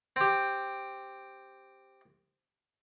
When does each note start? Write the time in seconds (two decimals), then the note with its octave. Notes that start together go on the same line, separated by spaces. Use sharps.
0.16 C4 G4